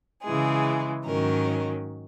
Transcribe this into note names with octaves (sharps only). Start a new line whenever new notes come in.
C#3 E3 G#3 G#4
G#2 D#3 F#3 C#4 A#4